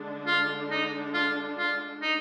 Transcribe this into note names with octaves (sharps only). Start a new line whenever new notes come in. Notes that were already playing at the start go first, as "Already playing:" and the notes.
Already playing: D3 G#3 D4
F4
D#4
F4
F4
D#4